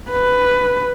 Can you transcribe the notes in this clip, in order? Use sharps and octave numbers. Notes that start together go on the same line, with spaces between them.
B4